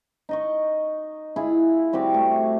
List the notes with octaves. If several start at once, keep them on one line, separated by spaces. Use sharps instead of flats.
D#4 D#5 C#6
E4 F4 G#4
G3 C4 F#4 G4
A3